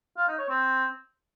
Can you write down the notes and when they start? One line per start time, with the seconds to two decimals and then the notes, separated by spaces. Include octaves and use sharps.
0.18 F4
0.28 D#4
0.39 C#5
0.49 C4